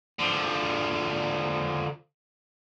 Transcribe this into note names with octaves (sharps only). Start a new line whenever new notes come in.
D3 F3